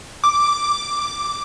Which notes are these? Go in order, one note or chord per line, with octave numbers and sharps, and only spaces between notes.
D6